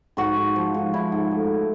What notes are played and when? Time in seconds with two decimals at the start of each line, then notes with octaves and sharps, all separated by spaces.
0.17 G#2 F#4
0.36 G#2
0.56 F3
0.74 G#2
0.93 G#2 E4
1.12 G#2
1.31 A3